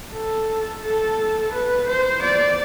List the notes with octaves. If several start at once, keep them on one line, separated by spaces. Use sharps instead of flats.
A4
A4
B4
C5
D5